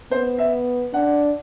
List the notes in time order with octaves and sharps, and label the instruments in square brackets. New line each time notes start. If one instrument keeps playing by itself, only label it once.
[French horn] B3 [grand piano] C5
[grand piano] E5
[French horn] D4 [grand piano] F#5